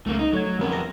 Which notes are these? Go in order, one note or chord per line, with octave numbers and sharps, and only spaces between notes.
C#2 C#3 A3 A#3
D#4
F#3 A3 C#5 G#6
F2 G3 B3 C#4 A#4
A#4 A#6